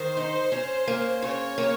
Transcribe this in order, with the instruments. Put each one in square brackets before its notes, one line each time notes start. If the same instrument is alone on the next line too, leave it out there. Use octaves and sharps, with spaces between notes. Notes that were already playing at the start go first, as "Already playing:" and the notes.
Already playing: [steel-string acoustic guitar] D#3 [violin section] C5
[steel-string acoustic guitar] D#4
C#4
A#3
[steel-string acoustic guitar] C#3 [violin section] C#5
[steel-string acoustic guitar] A#3